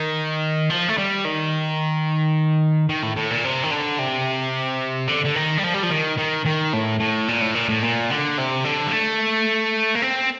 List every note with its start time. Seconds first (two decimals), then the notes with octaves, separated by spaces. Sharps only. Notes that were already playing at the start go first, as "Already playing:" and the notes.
Already playing: D#3
0.70 F3
0.89 A3
0.98 G3
1.25 D#3
2.89 D#3
3.03 A2
3.16 A2
3.30 A#2
3.44 C3
3.63 D#3
3.71 D3
3.99 C3
5.09 D3
5.25 D3
5.36 D#3
5.58 G3
5.64 F3
5.74 G3
5.83 F3
5.91 D#3
6.18 D#3
6.46 D#3
6.73 A2
7.00 A2
7.28 A#2
7.41 A2
7.54 A#2
7.69 A2
7.82 A#2
8.10 D3
8.38 C3
8.64 D3
8.87 G3
8.91 A3
9.95 A#3
10.02 C4